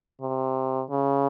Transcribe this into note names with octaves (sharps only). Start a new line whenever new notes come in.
C3
C#3